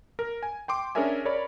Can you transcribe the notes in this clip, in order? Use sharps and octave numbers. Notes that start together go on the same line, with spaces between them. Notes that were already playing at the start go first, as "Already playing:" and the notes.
A#4
G#5
G5 C6 D6
C#4 D4 G#4 A#4 E5 G#5
A#4 C#5 D5 B5